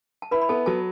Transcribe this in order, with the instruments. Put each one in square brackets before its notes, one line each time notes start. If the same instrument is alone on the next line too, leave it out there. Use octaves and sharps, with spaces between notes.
[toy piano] A5
[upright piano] E4 [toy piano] B4 B5
[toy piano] B5
[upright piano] B3 [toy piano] A4 A5
[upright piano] F#3 [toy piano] A4 A5